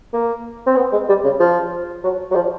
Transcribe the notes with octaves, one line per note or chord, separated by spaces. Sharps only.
A#3
C4
B3
G#3
G3
C#3
F3
F#3
F#3
F3